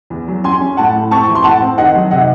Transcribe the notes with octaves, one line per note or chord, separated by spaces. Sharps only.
E2
F#3
C#4 G#5 C6
C#4
A2 F#5 A5
A2
C4 A5 C#6
E3
C6
A2 F#5 A5
C4
D#3 D#5 F#5
F#3
C3 D#5 F#5